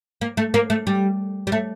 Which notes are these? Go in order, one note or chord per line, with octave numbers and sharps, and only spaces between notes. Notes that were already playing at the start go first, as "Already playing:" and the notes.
A#3
A3
A#3
A3
G3
G3
A3